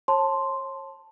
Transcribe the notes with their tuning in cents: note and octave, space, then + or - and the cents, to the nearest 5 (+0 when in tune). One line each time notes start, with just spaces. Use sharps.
C#5 -35 A5 +0 C6 +0